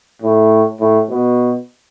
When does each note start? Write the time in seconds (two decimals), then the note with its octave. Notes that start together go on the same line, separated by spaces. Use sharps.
0.22 A2
0.80 A2
1.09 B2